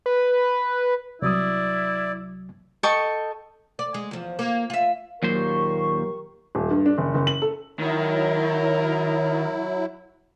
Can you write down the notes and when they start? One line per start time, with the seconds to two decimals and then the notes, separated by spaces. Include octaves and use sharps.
0.06 B4
1.22 C2 F#3 E4 D5 D#6
2.83 A4 D#5 G5 C#6
3.79 D5
3.94 G#3
4.11 E2 F3
4.39 A#3
4.70 F4 E5
5.23 D#2 A#2 F#3 G4 A#4 C5 C#6
6.55 D#1
6.71 G2
6.86 D4
6.98 F#1
7.14 F#1
7.27 F#7
7.42 A4
7.79 D#3 F#3 E4 A#4